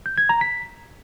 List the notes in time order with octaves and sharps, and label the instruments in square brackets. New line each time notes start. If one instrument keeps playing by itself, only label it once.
[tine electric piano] G6
G#6
A#5
B6